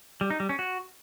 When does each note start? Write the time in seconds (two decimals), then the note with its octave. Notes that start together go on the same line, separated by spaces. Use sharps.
0.21 G3
0.30 D#4
0.40 G3
0.49 C#4
0.59 F#4